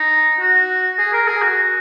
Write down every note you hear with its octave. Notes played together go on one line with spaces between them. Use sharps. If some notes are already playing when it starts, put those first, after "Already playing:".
Already playing: D#4
F#4
G#4
A#4
G#4
F#4